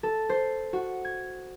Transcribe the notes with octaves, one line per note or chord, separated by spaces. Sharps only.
A4
C5
F#4
G#6